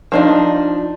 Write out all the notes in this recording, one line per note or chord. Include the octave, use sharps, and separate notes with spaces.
F3 D4 D#4